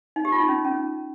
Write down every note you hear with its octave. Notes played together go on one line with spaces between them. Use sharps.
D#4
G4
F4
D#4
C#4
C#4